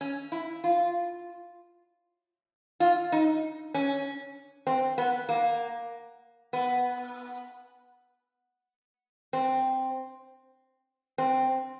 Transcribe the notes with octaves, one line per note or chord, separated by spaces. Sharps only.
C#4
E4
F4
F4
D#4
C#4
C4
B3
A#3
B3
C4
C4